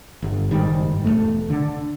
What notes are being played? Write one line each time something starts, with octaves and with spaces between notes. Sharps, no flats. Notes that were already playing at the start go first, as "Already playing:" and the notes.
G1
F#1 G#2 D#3 G3
E1 C#2 A3
D3